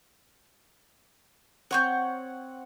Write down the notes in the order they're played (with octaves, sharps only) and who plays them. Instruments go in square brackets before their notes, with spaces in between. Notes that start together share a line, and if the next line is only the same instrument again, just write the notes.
[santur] C4 F#5 [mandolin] C#5 C#6 G6